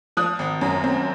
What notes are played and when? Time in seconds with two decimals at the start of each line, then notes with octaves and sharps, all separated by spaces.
0.17 F3 D#6 F#6
0.39 G#1
0.61 F#2
0.84 C4